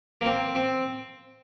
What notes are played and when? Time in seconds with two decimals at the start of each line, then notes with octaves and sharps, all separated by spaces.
0.21 A#3
0.25 C4
0.55 C4